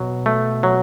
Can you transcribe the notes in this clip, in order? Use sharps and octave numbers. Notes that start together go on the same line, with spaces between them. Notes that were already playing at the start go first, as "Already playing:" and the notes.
Already playing: B2 F#3
A3
F#3